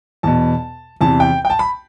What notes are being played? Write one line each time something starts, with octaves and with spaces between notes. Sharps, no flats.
E2 B2 A5
E2 C3 E3 A5
G5
G5
A5
B5